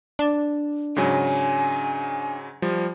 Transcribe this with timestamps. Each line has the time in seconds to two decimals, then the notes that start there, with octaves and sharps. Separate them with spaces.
0.19 D4
0.96 G#2 C#3 F#3 G#5
2.62 F3 G3